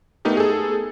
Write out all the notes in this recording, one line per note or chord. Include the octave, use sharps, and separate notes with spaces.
A3 B3 D#4 G4 A#4
G#4 A4